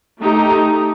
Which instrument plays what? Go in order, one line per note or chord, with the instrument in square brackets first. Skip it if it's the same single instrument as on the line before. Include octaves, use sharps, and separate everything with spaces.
[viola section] A3 D#4 G4 A#5